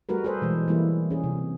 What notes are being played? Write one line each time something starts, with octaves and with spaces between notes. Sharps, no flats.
G3 A3 F#4 A#4 B4
G#4 A4 B4 C5
B2 E3 G#3
E3 G3 A#3 E4
C#4 G#4
C3